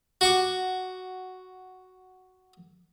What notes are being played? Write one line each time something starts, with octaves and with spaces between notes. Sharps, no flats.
F#4 C#6 D6